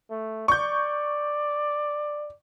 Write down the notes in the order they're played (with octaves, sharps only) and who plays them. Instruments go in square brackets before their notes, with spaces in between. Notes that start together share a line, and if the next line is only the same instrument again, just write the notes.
[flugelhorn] A3
[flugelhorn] D5 [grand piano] C#6 G6